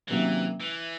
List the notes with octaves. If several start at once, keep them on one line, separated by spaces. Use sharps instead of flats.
C3 D#3 E3 F#3 A#3 C#4
E3